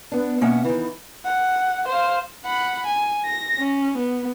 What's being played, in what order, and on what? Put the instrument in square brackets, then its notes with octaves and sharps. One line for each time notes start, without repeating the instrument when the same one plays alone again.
[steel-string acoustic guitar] B3 D4
B2 A#3 C#4 E5 F#5
D#3 E3
[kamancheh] F#5
C5 F5
[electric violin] F#5 B5
G#5
A#6
C#4
B3